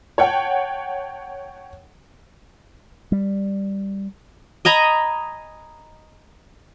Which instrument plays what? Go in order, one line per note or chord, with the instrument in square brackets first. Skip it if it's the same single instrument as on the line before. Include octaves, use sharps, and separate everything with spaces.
[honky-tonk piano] C#5 F#5 G5 A5
[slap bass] G3
[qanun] D#5 G#5 A#5 B5